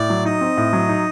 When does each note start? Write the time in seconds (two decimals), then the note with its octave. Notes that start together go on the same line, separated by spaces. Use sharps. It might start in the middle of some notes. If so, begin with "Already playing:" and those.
Already playing: A2 D5
0.10 F#3
0.25 D#4 D#5
0.41 C4
0.57 A2
0.73 F#3
0.89 D#4